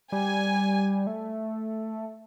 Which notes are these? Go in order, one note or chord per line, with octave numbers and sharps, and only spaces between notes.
G3 G#5
A3